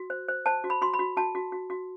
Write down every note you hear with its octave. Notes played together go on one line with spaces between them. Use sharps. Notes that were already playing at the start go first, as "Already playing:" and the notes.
Already playing: F#4
C5
C5
C5 A5
F#4
B5
F#4 C6
B5
F#4
F#4 A5
F#4
F#4
F#4